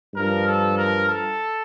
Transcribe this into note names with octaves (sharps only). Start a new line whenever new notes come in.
G2 F3 A#4
A4
A#4
A4